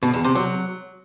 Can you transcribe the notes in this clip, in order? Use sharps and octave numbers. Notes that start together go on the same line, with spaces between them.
B2
E2
C3
F#3